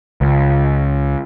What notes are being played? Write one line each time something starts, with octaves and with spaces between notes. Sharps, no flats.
C#2